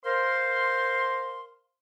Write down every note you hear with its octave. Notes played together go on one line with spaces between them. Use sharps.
A#4 C5 F5 C6